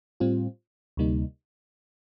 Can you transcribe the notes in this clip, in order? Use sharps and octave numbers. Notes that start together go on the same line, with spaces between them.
A2 G3 C4 F4
D2 C3 G3 A#3 D#4